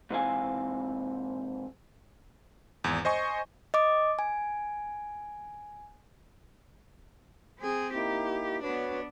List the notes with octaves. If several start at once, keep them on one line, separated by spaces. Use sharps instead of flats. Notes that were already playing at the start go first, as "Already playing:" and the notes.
G#2 C3 E3 C4 F5 G#5
G#1 E2
C5 D#5 G#5 C#6
D#5 D6
G#5
C4 G#4
A#3 D#4 E4 G4
B3 D4 F#4 B4 C#5